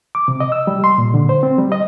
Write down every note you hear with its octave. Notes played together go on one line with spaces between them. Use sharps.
D6
C3
D#5
E6
G3
C6
A#2
D3
C5
C4
G3
D#5